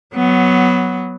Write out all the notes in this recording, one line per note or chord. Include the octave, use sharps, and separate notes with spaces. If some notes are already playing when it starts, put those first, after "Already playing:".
F#3 B3